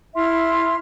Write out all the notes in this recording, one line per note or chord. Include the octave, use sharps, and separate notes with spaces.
E4 E5 C6 F6